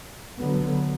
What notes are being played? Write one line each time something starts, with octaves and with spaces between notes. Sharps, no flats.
D3 F#3 B3